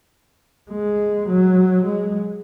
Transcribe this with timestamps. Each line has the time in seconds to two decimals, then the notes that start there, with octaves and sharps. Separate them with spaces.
0.71 G#3
1.29 F#3
1.86 G#3